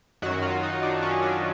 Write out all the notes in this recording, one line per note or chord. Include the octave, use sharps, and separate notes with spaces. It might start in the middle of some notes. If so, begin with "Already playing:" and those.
F#2 D#3 F#3 F#4
F4
D#4
D4
C#4
D4